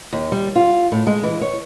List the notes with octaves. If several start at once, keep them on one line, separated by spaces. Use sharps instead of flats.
D#2
G3
F4
A2
G#3
E3
C#5